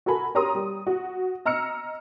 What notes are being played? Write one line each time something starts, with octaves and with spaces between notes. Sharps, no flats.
F#4 A4 A#4 G#5 B5
G4 A#4 C#5 A#5 C6 D#6
G3
F#4
D#5 A#5 E6 F6 C#7